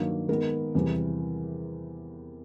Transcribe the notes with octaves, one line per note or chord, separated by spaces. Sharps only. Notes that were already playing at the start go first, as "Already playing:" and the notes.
Already playing: G2 D#3 F#3 A#3
D#3 G#3 B3 A#4
E2 C3 E3 G3